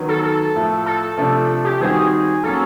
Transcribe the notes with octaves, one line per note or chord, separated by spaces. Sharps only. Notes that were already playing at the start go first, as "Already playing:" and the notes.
Already playing: D#3 F#3 B3
A4
A4
A2 F3 A3
A4
C3 F3 A3 D4 F4
G4
D#3 G3 C4 D#4 F#4 G#4
F#3 A#3 C#4 A4